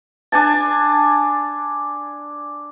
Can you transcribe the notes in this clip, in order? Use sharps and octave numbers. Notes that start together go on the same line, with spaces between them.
D4 G#5 A5